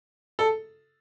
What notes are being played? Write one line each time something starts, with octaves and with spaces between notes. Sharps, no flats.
A4